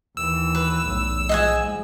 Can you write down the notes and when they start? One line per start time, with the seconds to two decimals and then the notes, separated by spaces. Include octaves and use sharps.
0.17 D#2 E3 E6
0.55 B4
0.87 B1 E2 A2
1.29 F3 G#3 D#5 F#5 G#5